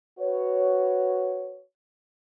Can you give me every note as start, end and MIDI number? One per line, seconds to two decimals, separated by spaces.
0.20 1.62 66
0.20 1.62 71
0.20 1.62 73